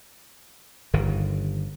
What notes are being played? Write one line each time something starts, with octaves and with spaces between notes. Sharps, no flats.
G1 G2 D#3